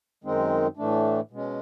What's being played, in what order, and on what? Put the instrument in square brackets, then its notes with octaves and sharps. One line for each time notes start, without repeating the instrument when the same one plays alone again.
[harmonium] F#2 D#3 G#3 C4 D#4
A2 E3 A3 D4
B2 G#3 C#4